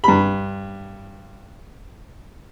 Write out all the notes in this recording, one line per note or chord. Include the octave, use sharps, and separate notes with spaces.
G2 B5